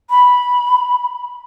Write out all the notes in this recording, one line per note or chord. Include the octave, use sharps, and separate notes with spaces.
B5